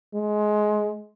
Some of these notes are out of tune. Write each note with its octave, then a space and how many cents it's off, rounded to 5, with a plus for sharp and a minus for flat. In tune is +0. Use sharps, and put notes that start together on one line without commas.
G#3 +20